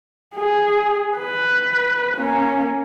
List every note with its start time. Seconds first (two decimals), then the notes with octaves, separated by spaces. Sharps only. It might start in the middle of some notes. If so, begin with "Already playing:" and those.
0.35 G#4
1.18 B4
2.16 A#3 C#4